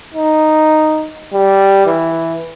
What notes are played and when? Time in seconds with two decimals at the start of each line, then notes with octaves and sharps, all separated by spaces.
0.14 D#4
1.34 G3
1.86 E3